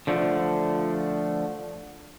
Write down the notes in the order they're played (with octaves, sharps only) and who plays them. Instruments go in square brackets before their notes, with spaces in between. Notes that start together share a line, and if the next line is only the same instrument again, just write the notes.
[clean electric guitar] D3 F3 A3